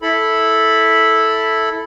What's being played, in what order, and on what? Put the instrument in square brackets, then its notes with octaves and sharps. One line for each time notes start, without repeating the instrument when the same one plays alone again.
[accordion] E4 A4 B5